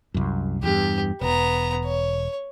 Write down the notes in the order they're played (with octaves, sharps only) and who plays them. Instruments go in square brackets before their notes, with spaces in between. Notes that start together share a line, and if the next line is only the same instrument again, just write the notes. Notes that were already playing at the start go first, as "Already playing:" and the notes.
[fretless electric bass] C2 F#2
[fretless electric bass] E2 G2 [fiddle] G4
[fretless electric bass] E1 [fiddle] B3 A#5
[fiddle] C#5